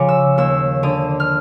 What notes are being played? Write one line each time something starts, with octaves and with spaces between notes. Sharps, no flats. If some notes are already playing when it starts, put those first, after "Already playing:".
Already playing: C#3 F3 D6
E6
D#2 E6
D3 D#6
F6